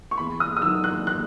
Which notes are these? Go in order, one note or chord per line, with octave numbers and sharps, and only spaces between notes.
C#6
E2 B5
D#6
D#6
D#3 F#3 E6
F#6
F#6